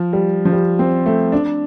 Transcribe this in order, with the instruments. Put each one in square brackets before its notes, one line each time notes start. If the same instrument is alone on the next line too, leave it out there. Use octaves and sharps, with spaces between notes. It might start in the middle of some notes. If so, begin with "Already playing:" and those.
Already playing: [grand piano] F3
G3
F3
G3
C4
A3
D4